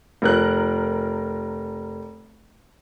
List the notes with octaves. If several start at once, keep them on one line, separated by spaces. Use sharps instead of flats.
F1 A#4 F#6